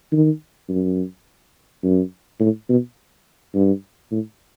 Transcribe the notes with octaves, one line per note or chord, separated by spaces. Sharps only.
D#3
F#2
F#2
A2
B2
G2
A2